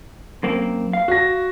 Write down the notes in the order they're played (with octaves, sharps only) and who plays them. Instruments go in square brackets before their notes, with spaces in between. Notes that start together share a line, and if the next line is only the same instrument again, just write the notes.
[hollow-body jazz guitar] F#2 A#3 C4
F5
[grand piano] F#4 A#6